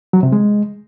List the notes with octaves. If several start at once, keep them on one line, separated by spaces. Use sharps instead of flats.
F#3
C3
G#3